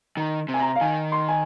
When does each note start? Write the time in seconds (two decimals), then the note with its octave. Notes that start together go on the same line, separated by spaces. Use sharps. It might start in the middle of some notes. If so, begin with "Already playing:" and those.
0.17 D#3 A#5
0.49 C3
0.54 G#5
0.59 A#5
0.75 F5
0.81 D#3 G#5
1.12 C6
1.29 G#5